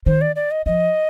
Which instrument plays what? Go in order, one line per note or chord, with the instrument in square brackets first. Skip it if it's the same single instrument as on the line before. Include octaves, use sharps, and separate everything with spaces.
[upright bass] D#3 [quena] C5
[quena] D5
D5
D#5
[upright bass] F3 [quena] D#5